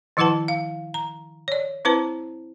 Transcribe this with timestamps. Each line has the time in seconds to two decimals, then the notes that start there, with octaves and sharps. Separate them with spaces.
0.17 D#3 F3 E4 B4 F#5 A5
0.48 F5
0.94 A#5
1.48 C#5 D5
1.85 C4 E4 B4 C5 A5